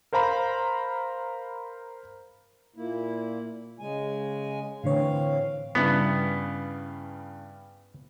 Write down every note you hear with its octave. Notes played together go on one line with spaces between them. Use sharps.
A#4 C5 F5 A#5 B5
A#2 A#3 E4
C#3 G#3 G#5
A2 D3 E3 C4 C#5 F5
G2 C#3 B3 E4